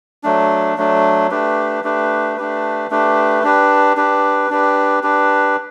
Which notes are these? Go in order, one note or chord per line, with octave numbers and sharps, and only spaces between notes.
F#3 A3 D4
F#3 A3 D4
A3 D4 G4 B4
A3 D4 G4 B4
A3 D4 G4 B4
A3 D4 G4 B4
D4 G4 B4
D4 G4 B4
D4 G4 B4
D4 G4 B4